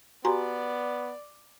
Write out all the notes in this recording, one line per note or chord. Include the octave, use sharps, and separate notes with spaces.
B3 F#4 G4 D5 G#5 A#5 C6